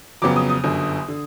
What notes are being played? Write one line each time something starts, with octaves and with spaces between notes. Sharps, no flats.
F2 C#3 F#3 B3 D6
D#6
D#6
G1 F#2 D3
D3